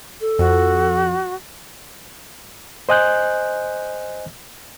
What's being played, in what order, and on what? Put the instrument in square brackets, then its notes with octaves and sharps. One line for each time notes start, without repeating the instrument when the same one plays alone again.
[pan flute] A4
[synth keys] F2 [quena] F#4
[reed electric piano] C5 D#5 G#5 F#6 G6